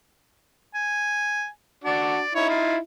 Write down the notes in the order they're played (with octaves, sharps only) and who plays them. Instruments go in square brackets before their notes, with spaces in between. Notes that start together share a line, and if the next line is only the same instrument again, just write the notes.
[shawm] G#5
[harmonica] D4 F#4 [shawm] D5
[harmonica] D#4 E4 [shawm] C#5
[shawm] F4